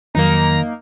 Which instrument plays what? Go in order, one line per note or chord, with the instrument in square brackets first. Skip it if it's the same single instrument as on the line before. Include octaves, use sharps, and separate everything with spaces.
[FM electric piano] F2 F#3 [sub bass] D#3 [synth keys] A#3 D#4 [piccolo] A#5